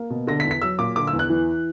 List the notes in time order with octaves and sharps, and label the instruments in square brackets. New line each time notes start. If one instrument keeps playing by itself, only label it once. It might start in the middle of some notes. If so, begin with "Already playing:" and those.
Already playing: [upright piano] A#3
B2
D3 A#6
B6
E2
B6
F#3 E6
A#2 D6
D3 D6
E6
E2
F#6
E3